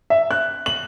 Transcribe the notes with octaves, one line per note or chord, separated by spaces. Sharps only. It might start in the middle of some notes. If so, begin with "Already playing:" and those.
E5
F#6
F#7